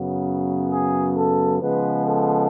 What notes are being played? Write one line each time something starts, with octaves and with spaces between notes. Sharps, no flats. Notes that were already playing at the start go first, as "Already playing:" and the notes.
Already playing: F#2 C#3 F#3 B3
G#4
A4
C#3 F3 G#3 B3 B4
A4